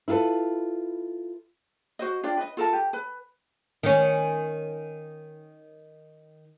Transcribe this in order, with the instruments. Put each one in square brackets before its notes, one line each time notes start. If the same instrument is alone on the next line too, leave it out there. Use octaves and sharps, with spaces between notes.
[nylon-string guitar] E4 F4 G#4 A4 B4
[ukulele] F#4 C5 D#5
D4 F4 D5 G5
B4 D#5
F4 A4 A#4 A5
G4
B4
[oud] D#3 C#4